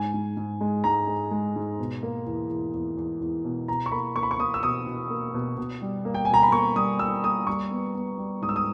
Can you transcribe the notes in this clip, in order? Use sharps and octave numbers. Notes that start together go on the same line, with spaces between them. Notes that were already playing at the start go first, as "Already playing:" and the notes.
Already playing: G#2 G#5
G#2
G#2
G#3
G#2 A#5
G#3
G#3
G#2
B2
A#3
E2
E2
E2
E2
E2
B2
B2 A#5
C#6
A#3 B5
A#3 C#6
B5
C#6
A#3 D#6
E6
B2 D#6
B2
A#3
B2
B2
G3
A#3
G5
G#5
B2 A#5
B5
A#3 C#6
G3 D#6
G3 E6
A#3 D#6
G3 C#6
B3
B3
G3
G#2 D#6
E6
D#6